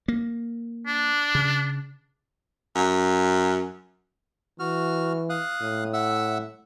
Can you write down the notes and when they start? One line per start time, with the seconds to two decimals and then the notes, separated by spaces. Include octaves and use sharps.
0.08 A#3
0.87 D4
1.35 C#3
2.75 F#2
4.59 E3 F#4 F6
5.30 F5 D#6 F#6
5.61 A2
5.93 E5 F#5 E6